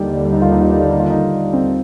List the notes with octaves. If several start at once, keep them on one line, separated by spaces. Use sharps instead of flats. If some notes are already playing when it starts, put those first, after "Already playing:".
Already playing: D#2 D3 G3 D#4 G4
D#4
F4
D#4
F4
D#4
F4
D#4
F4
D#4
C4